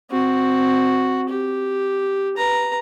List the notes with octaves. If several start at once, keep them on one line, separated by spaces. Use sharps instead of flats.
C4 F#4
G4
B4 A#5